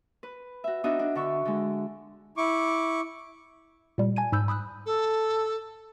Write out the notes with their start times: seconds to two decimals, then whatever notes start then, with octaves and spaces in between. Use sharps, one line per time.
0.23 B4
0.64 F#4 E5
0.84 B3 D4 D#4 F#4 D#5 E5
0.99 D4
1.15 D3 E5 C#6
1.45 D3 G#3
2.37 E4 C#6 D6
3.98 A#2 G3
4.16 G#5 A5 G#6 D#7
4.32 G#2 B5 E6 G6
4.48 B5 D#6 E6 F#6
4.86 A4